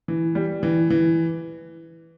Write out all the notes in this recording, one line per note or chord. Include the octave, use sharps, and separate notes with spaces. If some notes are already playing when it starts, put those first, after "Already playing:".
E3
G3
E3
E3